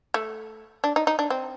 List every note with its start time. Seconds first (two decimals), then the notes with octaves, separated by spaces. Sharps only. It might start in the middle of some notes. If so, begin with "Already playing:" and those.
0.14 A3
0.84 D4
0.96 D#4
1.07 D#4
1.19 D4
1.30 C4